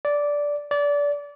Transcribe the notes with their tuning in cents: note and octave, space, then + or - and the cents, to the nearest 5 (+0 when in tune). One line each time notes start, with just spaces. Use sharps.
D5 -10
D5 -25